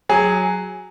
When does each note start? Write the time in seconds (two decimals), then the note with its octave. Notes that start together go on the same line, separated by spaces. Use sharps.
0.09 F#3 G#4